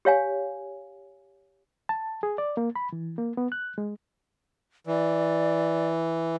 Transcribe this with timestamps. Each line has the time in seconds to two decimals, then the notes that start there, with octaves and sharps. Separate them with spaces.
0.05 G4 C#5 F5 G#5
1.89 A5
2.23 G#4
2.38 D5
2.57 A#3
2.76 B5
2.93 E3
3.18 A#3
3.37 B3
3.52 F#6
3.78 G#3
4.87 E3 D5